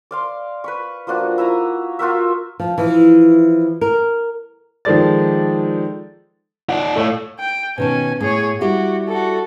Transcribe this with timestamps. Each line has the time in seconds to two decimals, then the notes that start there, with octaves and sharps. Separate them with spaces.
0.11 D5 F5 C6
0.64 B4 B5 C#6
1.07 F3 A#3 D4 F#4
1.38 E4 E5 A#5 D#6
1.99 F4 F#4 A#4 E5
2.60 F3
2.78 E3 F3
3.81 A#4
4.85 D#3 F3 G#3 A4 D5 A6
6.69 D#4 D5 F#5
6.96 A2 A4 C#5 F5
7.39 G5
7.78 B2 D#3 C#4 G#5 A5
8.21 A2 G#4 C#5
8.61 G3 E4 F#4 G4
9.08 F#4 A4